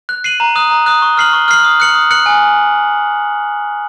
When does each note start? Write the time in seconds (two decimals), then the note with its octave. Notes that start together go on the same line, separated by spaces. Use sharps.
0.09 F#6
0.24 C7 D#7 F#7
0.40 A#5
0.56 D#6 F#6
0.71 A#5
0.86 D#6 F#6
1.02 C#6
1.17 F6 C7 F#7
1.33 C#6
1.48 F6 C7 F#7
1.64 D#6
1.80 F#6 C#7 F#7
1.95 D#6
2.11 F#6 C#7 F#7
2.26 G#5